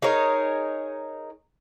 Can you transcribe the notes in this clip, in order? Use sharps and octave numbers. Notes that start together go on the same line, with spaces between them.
D#4 G#4 A#4 C#5